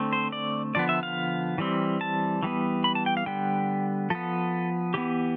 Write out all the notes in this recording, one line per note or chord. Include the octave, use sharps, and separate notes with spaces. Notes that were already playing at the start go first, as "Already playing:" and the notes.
Already playing: D3 A3 C4
C5
D5
D3 F3 B3 D5
E5
F5
E3 G3 C4
A5
E3 G3 B3
B5
A5
G5
F5
D3 G3 B3 G5
F3 B3 A4
E3 B3 G4